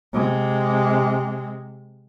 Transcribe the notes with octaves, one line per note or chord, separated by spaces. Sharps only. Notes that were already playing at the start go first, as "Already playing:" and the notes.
C3 G#3